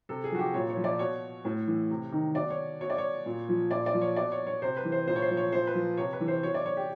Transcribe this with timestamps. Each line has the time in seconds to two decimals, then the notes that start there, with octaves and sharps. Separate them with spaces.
0.09 C3 A4
0.24 G#4
0.32 F3 F#4
0.39 G4
0.54 A#2 C#5
0.69 C#5
0.77 F3
0.84 D5
0.99 B2 C#5
1.45 A2
1.67 E3
1.90 C3
2.12 D#3
2.35 B2 D5
2.50 C#5
2.81 B2 C#5
2.90 D5
2.98 C#5
3.26 A#2
3.49 F3
3.71 A#2 D5
3.86 D5
3.94 F3
4.01 C#5
4.16 B2 D5
4.32 C#5
4.47 C#5
4.62 C3 C5
4.77 B4
4.85 E3
4.92 C5
5.07 A#2 C5
5.16 C#5
5.22 C5
5.30 F3
5.37 C#5
5.52 A#2 C5
5.67 B4
5.75 F3
5.97 C3 C#5
6.13 B4
6.20 E3
6.28 C5
6.43 B2 C#5
6.54 D5
6.66 C#5
6.77 G4